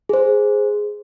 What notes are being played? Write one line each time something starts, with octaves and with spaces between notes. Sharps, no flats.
G#4 C5